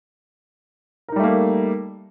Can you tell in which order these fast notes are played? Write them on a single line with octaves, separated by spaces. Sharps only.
A#4 D#4 G3 A3 A#3